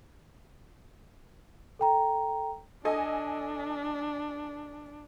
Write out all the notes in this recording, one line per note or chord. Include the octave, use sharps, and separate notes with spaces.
A4 G5 A#5
D4 A4 D#5 G#5